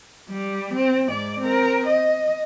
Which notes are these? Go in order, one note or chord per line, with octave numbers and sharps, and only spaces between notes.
G3
C4
G#2 D5
C4 A#4
D#5